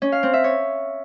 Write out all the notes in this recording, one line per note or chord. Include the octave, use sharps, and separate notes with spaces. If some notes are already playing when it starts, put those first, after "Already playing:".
C#4
F5
C4
E5
C#5